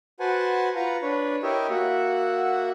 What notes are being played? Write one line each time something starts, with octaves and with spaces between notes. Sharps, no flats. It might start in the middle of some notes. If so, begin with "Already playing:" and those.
F#4 B4 C5 F#5 G#5 A5
F4 B4 F5 F#5 A#5
D4 B4 C#5
E4 G4 A#4 C#5 D#5 E5
A#3 F#4 E5 F#5